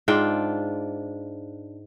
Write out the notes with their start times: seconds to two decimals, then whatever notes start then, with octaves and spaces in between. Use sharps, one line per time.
0.08 G#2 D4 F4 G5